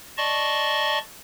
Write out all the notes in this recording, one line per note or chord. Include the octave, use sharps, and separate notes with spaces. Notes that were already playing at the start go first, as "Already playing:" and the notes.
D5 D#5 A5 C6 C#6